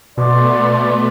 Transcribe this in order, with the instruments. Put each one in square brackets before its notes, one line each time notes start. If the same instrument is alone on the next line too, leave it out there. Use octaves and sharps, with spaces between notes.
[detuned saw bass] B2 [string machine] A3 B3 [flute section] D5 C6 D6